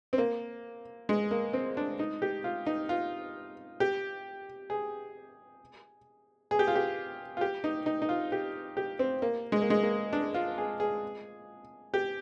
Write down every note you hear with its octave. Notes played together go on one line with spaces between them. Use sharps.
C4
A#3
G#3
A#3
C4
D4
D#4
G4
F4
D#4
F4
G4
G#4
G#4
G4
F4
G4
F4
G4
D#4
D#4
D#4
F4
G4
G4
C4
A#3
G#3
A#3
G#3
A#3
D4
F4
G#4
G#4
G4